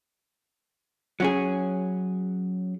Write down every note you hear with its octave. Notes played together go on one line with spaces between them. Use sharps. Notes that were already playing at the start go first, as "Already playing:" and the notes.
F#3 C#4 G#4